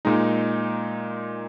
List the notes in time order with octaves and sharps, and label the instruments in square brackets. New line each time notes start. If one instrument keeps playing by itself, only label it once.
[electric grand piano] A#2 G#3 D#4